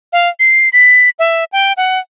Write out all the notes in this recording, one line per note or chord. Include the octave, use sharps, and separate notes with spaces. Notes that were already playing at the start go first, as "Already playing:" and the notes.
F5
C7
B6
E5
G5
F#5